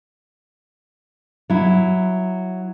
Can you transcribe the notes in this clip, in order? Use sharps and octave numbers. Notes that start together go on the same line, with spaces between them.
F#3 E4